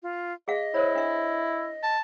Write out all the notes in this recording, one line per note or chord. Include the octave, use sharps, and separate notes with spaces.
F4
G#4 D#5 F5
E4 A#4 C5 C#5
D4 E5
A5